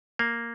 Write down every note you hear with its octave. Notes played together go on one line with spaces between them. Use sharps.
A#3